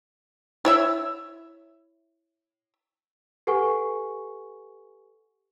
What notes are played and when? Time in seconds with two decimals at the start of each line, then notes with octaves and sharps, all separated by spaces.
0.65 E4 C#5 E5
3.47 G4 A4 B4 F#5 G#5 C#6